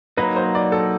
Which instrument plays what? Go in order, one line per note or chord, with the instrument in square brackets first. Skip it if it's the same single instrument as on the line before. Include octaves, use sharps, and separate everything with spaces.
[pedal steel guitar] F#3 A#3 D#4 [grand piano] B4
[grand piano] C5
D5
A4